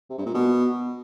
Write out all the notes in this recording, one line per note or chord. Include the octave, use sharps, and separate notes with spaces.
C3
G2
A#2
B2